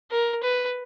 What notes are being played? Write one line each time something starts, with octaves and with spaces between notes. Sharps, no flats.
A#4
B4